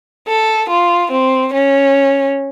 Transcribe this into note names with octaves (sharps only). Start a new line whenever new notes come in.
A4
F4
C4
C#4